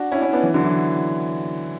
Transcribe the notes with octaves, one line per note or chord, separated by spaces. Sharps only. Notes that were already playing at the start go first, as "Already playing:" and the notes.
Already playing: D4 F#4
C#4 E4
C#4 E4
B3 D4
E3
D3 F#3
E3